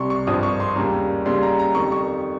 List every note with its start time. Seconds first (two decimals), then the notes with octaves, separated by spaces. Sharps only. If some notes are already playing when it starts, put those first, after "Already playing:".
Already playing: C2 C3 G3 C6 C#6
0.10 C#6
0.27 G#1 G2 F3 D#6
0.43 C#6
0.60 C6
0.76 D#2 C#3 G3 A#5
1.26 D#2 C#3 G3 C6
1.43 A#5
1.59 A#5
1.75 F2 D#3 G3 C#6
1.92 C#6